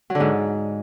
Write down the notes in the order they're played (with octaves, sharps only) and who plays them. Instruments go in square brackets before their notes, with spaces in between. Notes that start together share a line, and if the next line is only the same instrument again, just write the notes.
[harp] F#3
D3
G#2